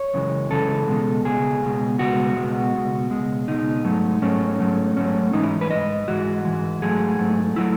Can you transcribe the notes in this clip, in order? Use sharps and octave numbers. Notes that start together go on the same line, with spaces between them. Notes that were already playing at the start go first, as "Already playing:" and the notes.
Already playing: C#5
F#2 C#3 E3 G#3
F#2 C#3 E3 G#3 A4
C#2 B2 G#3
C#2 B2 G#3 G#4
C#2 B2 G#3
C#2 B2 G#3 F#4
C#2 B2 G#3
C#2 B2 G#3
C#2 B2 G#3
C#2 B2 G#3 D#4
G#2 F#3 A3
G#2 F#3 A3 C#4
G#2 F#3 A3
G#2 F#3 A3 C#4
G#2 E3 G#3 D#4
E4
B4
G#2 E3 G#3 D#5
G#2 E3 G#3 F#4
G#2 E3 G#3
G#2 F#3 A3 G#4
G#2 F#3 A3
F#3 A3 E4